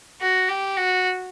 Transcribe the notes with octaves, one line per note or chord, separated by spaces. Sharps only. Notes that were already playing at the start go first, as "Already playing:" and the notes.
F#4
G4
F#4